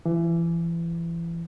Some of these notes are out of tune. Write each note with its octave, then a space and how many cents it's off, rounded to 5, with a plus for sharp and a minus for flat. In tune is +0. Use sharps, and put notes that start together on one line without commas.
E3 +30